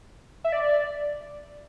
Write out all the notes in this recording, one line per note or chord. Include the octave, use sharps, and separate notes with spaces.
E5
D5